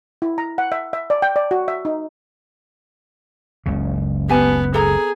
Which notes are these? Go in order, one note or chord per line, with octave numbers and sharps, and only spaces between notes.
E4
A#5
F#5
E5
E5
D5
G5
D5
F#4
E5
D#4
F#1 C#2 C#3
B3 G4 G#5 A5
G#4 A4 A#5